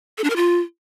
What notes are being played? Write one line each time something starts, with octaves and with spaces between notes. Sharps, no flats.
A4
D4
A#4
F4